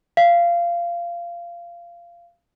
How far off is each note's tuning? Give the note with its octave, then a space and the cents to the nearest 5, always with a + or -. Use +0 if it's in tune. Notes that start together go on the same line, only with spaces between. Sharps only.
F5 -20